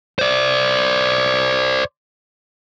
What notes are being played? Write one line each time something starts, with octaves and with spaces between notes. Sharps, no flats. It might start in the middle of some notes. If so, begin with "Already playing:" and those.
C5 D5